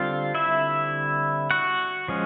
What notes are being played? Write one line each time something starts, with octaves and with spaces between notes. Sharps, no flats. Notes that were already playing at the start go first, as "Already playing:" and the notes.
Already playing: D3 G3 C4 F4 F5
E4 E5
F#4 F#5
F3 G#3 C#4